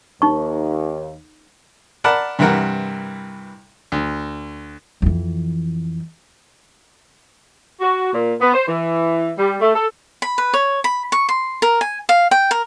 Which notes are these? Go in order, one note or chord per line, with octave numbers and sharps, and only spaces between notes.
D#2 D#4 C#6
A#4 D5 F#5 A5 B5
G2 C3 E3 A#4 F#5
D2
F2 E3
F#4
A#2
B3
C5
E3
G3
A3
A4
B5
B4
C#5
B5
C#6
C6
A#4
G#5
F5
G5
A#4